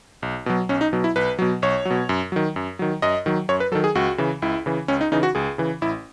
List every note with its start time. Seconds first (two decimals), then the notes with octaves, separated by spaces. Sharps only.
0.22 B1
0.46 B2 F#3
0.69 B1 C#4
0.81 D#4
0.93 B2 F#3
1.04 E4
1.16 B1 B4
1.39 B2 F#3
1.62 B1 C#5
1.85 F#3
1.90 B2
2.09 F#2
2.32 D#3 F#3
2.56 F#2
2.79 D#3 F#3
3.02 F#2 D#5
3.26 D#3 F#3
3.49 F#2 C#5
3.60 B4
3.72 F#3 A4
3.75 D#3
3.84 G#4
3.95 C#2 F#4
4.18 C#3 E3
4.42 C#2 E4
4.66 C#3 E3
4.88 C#2 C#4
5.01 D#4
5.12 C#3 E3 D#4
5.23 F#4
5.35 C#2 G#4
5.58 C#3 E3
5.82 A1 E4